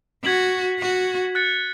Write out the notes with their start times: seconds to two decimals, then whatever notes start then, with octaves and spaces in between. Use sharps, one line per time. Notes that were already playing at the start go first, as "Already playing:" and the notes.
0.24 F#4 G#6 B6 F#7
0.80 F#4
1.35 F#6 A6 C#7